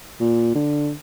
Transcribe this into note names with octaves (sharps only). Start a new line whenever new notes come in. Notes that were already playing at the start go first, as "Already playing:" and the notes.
A#2
D3